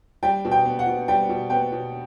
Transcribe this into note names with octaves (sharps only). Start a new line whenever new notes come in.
G3 G5
B2
G5
B3
F#5
B2
G3 G5
B2
B3 G5
B2